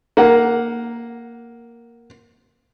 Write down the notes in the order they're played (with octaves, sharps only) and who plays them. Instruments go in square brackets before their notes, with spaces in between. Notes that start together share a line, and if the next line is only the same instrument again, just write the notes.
[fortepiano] A#3 F#5